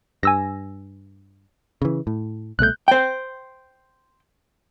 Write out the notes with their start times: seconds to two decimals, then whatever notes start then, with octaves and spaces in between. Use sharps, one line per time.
0.23 G2 G#5 E6 A#6
1.82 C#3 E3
2.07 A2
2.59 C2 B2 A3 F#6 G6
2.88 C5 G5